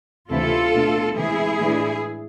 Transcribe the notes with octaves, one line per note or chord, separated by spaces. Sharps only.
D2 C3 E3 A3 E4 F4 A4
B2 A3 D4
C3 E3 G#3 E4 G#4
A2 E3 G#3 D4